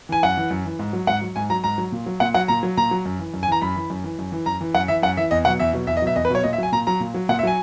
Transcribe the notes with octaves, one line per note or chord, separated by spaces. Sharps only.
E3 G#5
F#2 F#5
E3
F#2
E3
G#2
F#3
G#2 F#5
F#3
G#2 G#5
F#3 A#5
G#2 A#5
F#3
A#2
F#3
A#2 F#5
F#3 F#5
A#2 A#5
F#3
A#2 A#5
F#3
F#2
E3
F#2
G#5
E3 A#5
F#2 B5
E3
F#2
E3
F#2
E3
F#2 A#5
E3
F#2 F#5
E3 E5
F#2 F#5
E3 E5
E2 D#5
B2 F#3 F#5
E2 E5
B2 F#3
E2 E5
D#5
B2 F#3 E5
E2 D#5
B4
B2 F#3 C#5
A#2 D#5
E5
F#3 G#5
A#2 A#5
F#3 A#5
A#2
F#3
A#2 F#5
E5
F#3 G#5